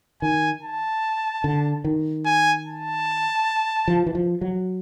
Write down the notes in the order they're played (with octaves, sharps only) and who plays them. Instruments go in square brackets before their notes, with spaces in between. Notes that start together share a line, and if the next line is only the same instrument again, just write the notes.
[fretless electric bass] D#3 [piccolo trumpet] G#5
[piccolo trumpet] A5
[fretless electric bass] D3
D#3
[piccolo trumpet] G#5
A5
[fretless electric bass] F3
E3
F3
F#3